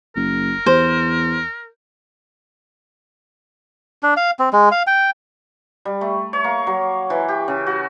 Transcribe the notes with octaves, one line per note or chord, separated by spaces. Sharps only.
F#1 A#4
E2 C5
D4
F5
C4
G#3
F5
G5
G3
A3
C#5
A#3
F#3
E3
G4
C#3
F#4